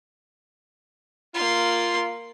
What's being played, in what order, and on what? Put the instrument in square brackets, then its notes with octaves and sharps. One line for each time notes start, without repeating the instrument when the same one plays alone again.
[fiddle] A#3 C6 [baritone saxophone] F4